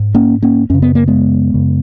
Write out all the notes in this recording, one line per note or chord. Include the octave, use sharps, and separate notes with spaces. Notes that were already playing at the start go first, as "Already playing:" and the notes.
Already playing: G#2
A#3 C#4
A#3 C#4
F#2 C#3 C#4
B3
A#3
G#3 B3
F#2 C#3